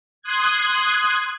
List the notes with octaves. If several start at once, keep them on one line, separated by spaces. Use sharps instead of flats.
C6 D#6 F#6 G#6